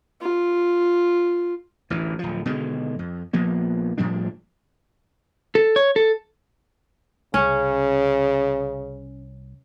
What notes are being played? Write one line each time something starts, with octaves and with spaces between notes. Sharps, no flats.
F4
A1 D2 E3
D1 F3
B2 D3 D#3 G#3
F2
A#1 F3 A#3 B3
A2 F3 G3 D4
A4
C#5
A4
C2 C#3 C#4